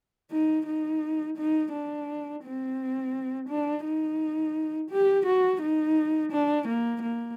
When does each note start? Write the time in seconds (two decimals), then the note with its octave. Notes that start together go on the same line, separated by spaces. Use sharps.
0.31 D#4
0.66 D#4
1.37 D#4
1.72 D4
2.43 C4
3.49 D4
3.84 D#4
4.91 G4
5.26 F#4
5.62 D#4
6.32 D4
6.68 A#3
7.02 A#3